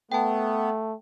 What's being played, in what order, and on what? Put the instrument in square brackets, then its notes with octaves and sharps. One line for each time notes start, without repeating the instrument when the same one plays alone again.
[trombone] A3 [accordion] B3 [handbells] G5 A5